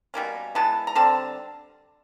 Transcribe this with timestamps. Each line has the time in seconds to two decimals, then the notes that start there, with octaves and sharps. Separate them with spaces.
0.14 B2 G3 A#3 C#4
0.55 E3 G#3 B3 A5
0.87 A#5
0.95 D3 G3 C4 A5